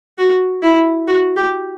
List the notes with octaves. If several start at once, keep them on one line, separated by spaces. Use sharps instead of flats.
F#4
E4
F#4
G4